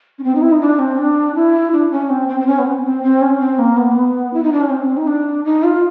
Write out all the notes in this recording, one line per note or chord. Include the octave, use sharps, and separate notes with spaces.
C#4
C4
D#4
E4
D#4
D4
C4
D4
E4
D4
C#4
C4
C4
C4
C#4
B3
C4
C4
C4
C#4
C4
A#3
B3
A#3
B3
E4
D#4
D4
C#4
C4
D#4
D4
D#4
F4